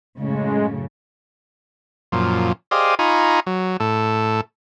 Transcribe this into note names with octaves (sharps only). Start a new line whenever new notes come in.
F#2 A2 C#3 G#3
F#2 A#2 F3
G4 G#4 C5 D5 D#5 F5
D#4 F4 G#5 A#5 B5 C#6
F#3
A2 A4